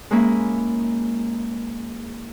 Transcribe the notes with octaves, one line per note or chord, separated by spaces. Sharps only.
G#3 A#3 C#4 E4